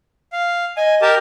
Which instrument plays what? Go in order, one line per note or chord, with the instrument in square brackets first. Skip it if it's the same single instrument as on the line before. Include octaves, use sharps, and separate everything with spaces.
[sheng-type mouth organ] F5
[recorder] D#5 [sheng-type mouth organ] G#5
[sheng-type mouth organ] G4 A#4 A5